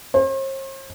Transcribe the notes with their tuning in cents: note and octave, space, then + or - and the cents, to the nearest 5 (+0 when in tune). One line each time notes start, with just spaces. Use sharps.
C5 +45